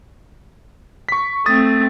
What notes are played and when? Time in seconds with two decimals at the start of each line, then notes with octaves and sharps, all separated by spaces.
1.09 C#6 B6
1.46 A3 C4 D#6 A6